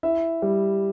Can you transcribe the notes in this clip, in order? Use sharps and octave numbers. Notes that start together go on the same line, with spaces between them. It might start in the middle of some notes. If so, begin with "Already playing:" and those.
E4 E5
G3